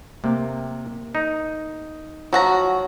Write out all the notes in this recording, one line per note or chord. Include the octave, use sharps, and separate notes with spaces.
C3 A#3
D#4
F3 F#3 F#4 A#5